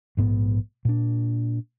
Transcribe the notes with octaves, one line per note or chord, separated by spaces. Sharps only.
A#1 G#2 B3
A#2 D4